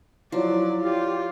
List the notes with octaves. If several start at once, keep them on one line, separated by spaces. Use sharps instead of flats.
F3 F#3 D#4 E4 C#5 D5
F4 G4